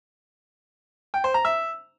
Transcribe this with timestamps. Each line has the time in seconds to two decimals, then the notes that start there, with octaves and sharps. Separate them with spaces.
1.14 G5
1.24 C5
1.34 A#5
1.45 E5